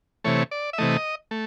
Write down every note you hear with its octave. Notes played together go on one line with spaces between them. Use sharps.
C3 E3 A3 C#5
D5
E5
C3 E3 A3 D#5
A3